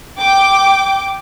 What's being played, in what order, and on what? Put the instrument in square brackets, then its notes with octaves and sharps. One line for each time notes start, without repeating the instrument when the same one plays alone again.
[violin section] G5 D6